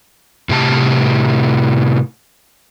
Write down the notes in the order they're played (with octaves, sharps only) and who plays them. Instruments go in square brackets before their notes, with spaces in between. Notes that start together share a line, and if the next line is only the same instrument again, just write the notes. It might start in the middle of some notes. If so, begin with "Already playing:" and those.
[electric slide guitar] A2 C3 G4 A5